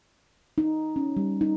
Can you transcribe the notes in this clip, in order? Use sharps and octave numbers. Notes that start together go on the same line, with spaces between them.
D#4
C#4
G3
D#4